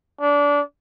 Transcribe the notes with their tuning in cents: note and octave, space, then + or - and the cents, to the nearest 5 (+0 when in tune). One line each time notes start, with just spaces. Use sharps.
D4 -25